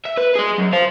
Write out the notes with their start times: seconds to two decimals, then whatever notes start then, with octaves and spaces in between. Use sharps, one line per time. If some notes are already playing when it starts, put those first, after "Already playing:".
0.05 E5
0.17 B4
0.35 G#4 D#5
0.58 F#2
0.73 C5 F5